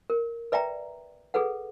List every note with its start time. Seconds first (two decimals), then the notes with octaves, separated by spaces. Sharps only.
0.10 A#4
0.52 B4 D5 E5 G5 A#5
1.34 G#4 A4 B4 F#5